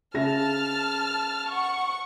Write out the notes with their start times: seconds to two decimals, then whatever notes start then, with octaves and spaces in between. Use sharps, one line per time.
0.14 C#3 E5 A5 F6 A#6
1.50 F#5 C#6